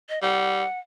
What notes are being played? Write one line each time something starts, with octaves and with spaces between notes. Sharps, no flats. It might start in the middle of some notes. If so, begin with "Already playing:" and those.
D#5
G3 F#5